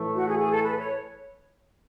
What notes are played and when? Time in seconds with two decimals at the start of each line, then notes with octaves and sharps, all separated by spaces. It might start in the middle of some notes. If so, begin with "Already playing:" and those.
Already playing: A2 E3 A3
0.16 F#4
0.27 G#4
0.39 G#4
0.51 A4
0.63 B4
0.79 C#5